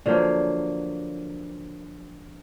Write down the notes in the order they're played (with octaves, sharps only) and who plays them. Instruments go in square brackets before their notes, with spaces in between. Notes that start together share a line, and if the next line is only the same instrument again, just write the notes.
[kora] D3 F3 F#3 A#3